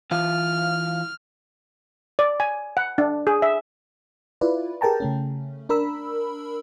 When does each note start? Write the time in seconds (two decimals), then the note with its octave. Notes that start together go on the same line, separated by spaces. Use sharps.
0.11 E3 F4 F5 F6
2.19 D5
2.40 G#5
2.77 F#5
2.98 D4
3.27 G#4
3.42 E5
4.41 E4 F4 B4 D5
4.81 G4 G#4 A#4 G5 A5 A#5
5.00 C#3 A3 C#4
5.69 D4 A#4 B5 E6